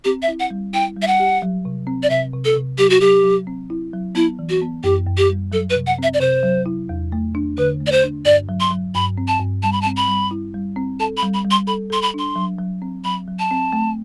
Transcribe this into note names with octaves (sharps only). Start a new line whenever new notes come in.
C4 G4
E5
E4
F#5
G3
E4 G5
G3
E5
F#5
G4
F#3
C3
C4
D5
C3 E5
C3
A4
C3
F#3 G4
F#4
F#3 G4
F#3
C4
E4
F#3
B3 E4
E3
F#4
B3
F#2 G4
F#2
G4
G3
F#3 A4
B4
C3
F#5
C4 E5
D5
C3 C5
F#3
E4
E2
A3
D4
D3 B4
A3
D5
C5
D4
G2 D5
F#3
C6
F#3
G2 B5
C4
A5
G2
G3 A5
B5
A5
C4
B5
G3
E4
G3
C4
A4 A5
B5
G3
B5
G3
C6
A4 B5
A4 C6
B5
D4 C6
F#3
F#3
C4
F#3 B5
F#3
A5
C4
A3